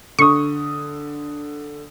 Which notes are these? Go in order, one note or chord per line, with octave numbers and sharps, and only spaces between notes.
D3 C#6 D#6